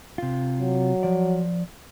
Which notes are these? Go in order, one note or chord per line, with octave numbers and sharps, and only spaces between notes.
C3 F4
F#3
F3 D5